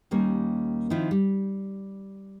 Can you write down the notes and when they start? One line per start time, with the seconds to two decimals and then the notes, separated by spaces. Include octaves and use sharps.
0.11 D#2 G3 A#3 C#4
0.90 D#3 F3 C4 E4 F4
1.11 G3